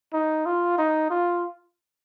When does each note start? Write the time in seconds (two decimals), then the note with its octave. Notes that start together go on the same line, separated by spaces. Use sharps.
0.13 D#4
0.46 F4
0.78 D#4
1.10 F4